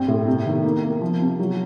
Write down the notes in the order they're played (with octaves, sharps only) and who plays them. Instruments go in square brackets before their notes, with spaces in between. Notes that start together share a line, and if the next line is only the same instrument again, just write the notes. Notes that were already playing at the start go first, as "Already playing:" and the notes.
Already playing: [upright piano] G2 C4
A2
C3
D#3
A#3
A#3
F3
C3
F#3